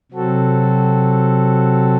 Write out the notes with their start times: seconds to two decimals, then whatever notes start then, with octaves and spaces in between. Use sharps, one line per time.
0.11 C3 F#3 C4 F#4 A4